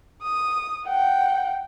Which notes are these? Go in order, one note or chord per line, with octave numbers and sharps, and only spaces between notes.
D#6
F#5 G5